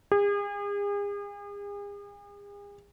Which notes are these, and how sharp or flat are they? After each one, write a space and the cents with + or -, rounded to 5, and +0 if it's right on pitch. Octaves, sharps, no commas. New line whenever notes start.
G#4 -40